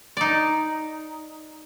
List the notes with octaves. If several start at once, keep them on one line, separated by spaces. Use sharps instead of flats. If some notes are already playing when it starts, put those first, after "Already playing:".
D#4 D5